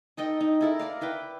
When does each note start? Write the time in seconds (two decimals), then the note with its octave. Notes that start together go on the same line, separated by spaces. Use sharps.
0.17 D#4 A4 D#5 G5
0.41 D#4
0.61 E4 A4 A#4
0.79 A#4 D5 F5
1.01 E4 B4 G5 D6